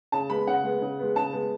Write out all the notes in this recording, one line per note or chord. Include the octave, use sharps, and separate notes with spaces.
C#3 A5
G#3 B3 B5
C#3 F#5
G#3 B3
C#3
G#3 B3
C#3 A5
G#3 B3